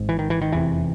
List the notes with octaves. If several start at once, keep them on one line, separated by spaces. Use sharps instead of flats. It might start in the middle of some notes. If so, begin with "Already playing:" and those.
Already playing: G#1 G#2
E3
D#3
E3
D#3
F1 E2 C3 E3